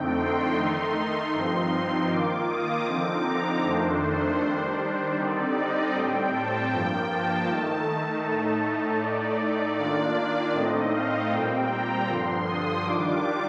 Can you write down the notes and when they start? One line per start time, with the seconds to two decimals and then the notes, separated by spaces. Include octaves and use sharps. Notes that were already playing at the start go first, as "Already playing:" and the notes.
Already playing: F2 D3 A3 C4 D#4 G5
0.19 C6
0.56 D#3 A3 D#4 C6
1.34 G2 F3 C4 D#4 C6
2.10 D#3 A#3 F4 D6
2.49 D#6
2.86 D3 F3 C4 D#4 D6
3.26 A#5
3.63 F2 D#3 A3 D4 C5
4.40 D#3 G3 D4
5.17 D3 G3 C4 D#4 D5
5.55 D#5
5.93 A2 G3 C4 G5
6.32 A5
6.71 G2 F3 A#3 G5
7.10 A5
7.48 D#3 A3 D#4
8.24 A2 A3 D#4
9.01 A2 A3 D#4 D5
9.40 D5
9.78 D#3 A#3 D4 F4 D5
10.54 A2 A3 C4 D#4 D#5
10.93 F5
11.31 A#2 G3 C4 G5
11.70 A#5
12.08 G2 D3 F3 C6
12.46 D#6
12.84 D#3 G3 D4 F4 D6